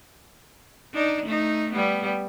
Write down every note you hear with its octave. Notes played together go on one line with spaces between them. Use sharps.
D4 D#4
A3 D#4
G3 B3